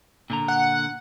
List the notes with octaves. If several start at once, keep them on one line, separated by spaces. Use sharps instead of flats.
A#2 D3 A#5
F#5